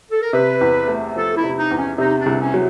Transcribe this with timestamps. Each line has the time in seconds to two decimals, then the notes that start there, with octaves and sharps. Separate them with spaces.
0.11 A4
0.22 A#4
0.33 C3 B4
0.61 E2
0.88 A3
1.16 F3 A4
1.36 E4
1.44 C3
1.58 D#4
1.71 E2
1.77 C#4
1.98 C3 D#4
2.19 D4
2.26 C2
2.40 C#4
2.54 F#3